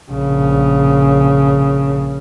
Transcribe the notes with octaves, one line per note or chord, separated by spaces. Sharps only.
A#1 C#3